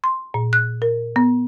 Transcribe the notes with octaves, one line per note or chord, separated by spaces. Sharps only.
C6
A#2
F#6
A#4
B3